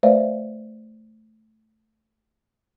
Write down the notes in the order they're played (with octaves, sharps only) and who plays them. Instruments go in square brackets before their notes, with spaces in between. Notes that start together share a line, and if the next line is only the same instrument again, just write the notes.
[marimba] A3 B4 C5 D5 E5 F5